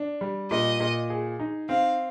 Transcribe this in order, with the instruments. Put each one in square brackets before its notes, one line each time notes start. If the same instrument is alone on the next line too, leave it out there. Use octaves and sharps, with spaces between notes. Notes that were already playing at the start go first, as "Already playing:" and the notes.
Already playing: [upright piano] D4
G3
[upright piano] A#2 [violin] D#5
[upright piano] A#2
G#4
D#4
[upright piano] C4 [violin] F5